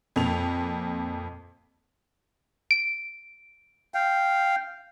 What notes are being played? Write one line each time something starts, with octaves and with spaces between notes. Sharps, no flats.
F2 A#2 F7
D7
F5 G5